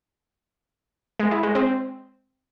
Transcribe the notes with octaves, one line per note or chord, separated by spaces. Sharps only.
G#3
E4
G#3
C4